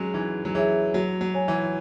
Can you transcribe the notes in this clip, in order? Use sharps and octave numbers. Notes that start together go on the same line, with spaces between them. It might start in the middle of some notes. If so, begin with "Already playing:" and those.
Already playing: F#3 G#3 C#4
E3 D#4
F#3
E3 G#4 C#5 E5
F#3 F#4
F#3
C#5 G#5
E3